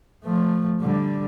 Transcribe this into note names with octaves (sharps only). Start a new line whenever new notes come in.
F3 A3
D3 G3